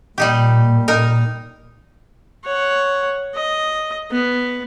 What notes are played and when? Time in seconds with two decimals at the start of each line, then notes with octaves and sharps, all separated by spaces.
0.18 A#2 G3 D#4 G4
0.88 D#4 A#4
2.44 C#5 F#5
3.35 D#5
4.11 B3